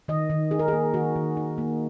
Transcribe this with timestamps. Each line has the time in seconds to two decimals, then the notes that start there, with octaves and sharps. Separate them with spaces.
0.08 D#3 D#5
0.30 D#3
0.51 D#4 G#4
0.59 A#4
0.68 A#3 G#4
0.94 D#3 F#4
1.16 D#3
1.37 D#4
1.58 A#3